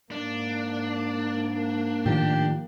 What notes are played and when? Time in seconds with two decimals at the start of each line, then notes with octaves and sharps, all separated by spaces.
0.11 G#2 A#3 D4
2.06 A2 D#3 F3 G4